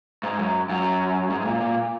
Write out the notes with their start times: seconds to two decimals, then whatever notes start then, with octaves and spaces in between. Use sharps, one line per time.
0.23 G#2
0.39 F#2
0.70 F#2
1.30 G#2
1.45 A#2
1.60 A#2